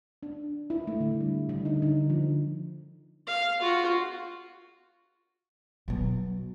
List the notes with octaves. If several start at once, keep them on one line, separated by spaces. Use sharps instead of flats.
D4
E4
A3
D3
G3
D3
D#4
D3
F3
F5
F4 F#4
B2 F#3